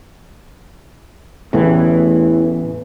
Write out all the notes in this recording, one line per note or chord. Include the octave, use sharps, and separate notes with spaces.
A1 E2 A2 E3